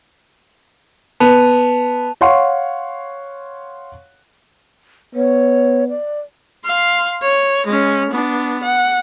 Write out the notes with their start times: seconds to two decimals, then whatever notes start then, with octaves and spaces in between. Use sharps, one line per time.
1.20 B3 A5 D#7 F7
2.21 C#5 F5 F#5 C6 C#6
5.15 B3 C#5
5.89 D5
6.65 F5 C6
7.22 C#5
7.66 G#3 C#4
8.10 B3 D4
8.63 F#5